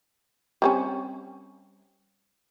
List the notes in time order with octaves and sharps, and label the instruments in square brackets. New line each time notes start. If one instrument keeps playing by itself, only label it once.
[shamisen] G3 C4 C#4